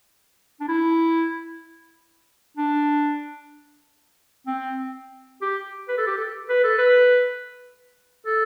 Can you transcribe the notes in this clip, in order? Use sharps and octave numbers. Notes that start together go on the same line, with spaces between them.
D4
E4
D4
C4
G4
B4
A4
G4
A4
B4
A4
B4
A4